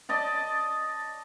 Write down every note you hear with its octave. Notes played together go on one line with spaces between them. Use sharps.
D5 D#5 A5